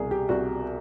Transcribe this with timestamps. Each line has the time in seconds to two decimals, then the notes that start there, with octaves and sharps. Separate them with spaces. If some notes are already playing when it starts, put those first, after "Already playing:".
Already playing: C2 B2 G#4
0.11 G4
0.29 C2 F#4